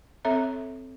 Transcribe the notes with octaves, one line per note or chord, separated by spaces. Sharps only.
C4 A4 C#5 E5 A#5